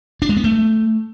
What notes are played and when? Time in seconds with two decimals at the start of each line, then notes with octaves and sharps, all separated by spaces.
0.22 D4
0.29 G#3
0.37 B3
0.44 A3